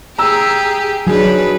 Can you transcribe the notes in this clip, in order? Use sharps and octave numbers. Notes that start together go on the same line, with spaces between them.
G4 G#4 A#5 E6
F#3 D4 D#4 G#4 B4